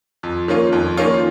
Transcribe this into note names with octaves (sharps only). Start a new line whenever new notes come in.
F2
D#3 A#3 C#4 F4
F2
D#3 A#3 C#4 F4